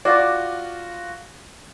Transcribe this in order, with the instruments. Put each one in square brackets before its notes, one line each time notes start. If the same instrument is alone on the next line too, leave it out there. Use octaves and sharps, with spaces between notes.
[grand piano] F4 F#4 [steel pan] D5